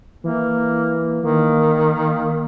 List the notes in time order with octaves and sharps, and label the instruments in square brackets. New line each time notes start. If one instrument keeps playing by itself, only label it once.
[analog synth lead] E3 [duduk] A#3
[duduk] D#3 [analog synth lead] A#3